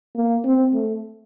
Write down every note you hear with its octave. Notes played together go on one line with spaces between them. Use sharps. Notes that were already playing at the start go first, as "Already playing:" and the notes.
A#3
C4
A3